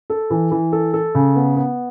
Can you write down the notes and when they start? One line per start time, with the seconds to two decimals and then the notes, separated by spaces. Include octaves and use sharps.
0.10 A4
0.30 E3
0.51 E3
0.72 A4
0.93 A4
1.15 C#3
1.36 B3
1.57 B3